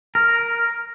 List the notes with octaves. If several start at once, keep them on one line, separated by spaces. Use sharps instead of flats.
A#4